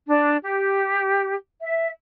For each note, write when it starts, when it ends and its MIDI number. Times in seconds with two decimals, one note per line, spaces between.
0.08 0.38 62
0.43 1.35 67
1.61 1.89 76